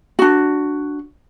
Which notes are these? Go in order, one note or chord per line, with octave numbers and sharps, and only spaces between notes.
D4 F#4